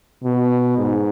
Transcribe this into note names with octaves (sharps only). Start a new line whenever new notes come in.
B2
G#2